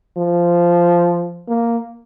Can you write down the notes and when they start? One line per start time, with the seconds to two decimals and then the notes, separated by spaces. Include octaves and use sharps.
0.17 F3
1.48 A#3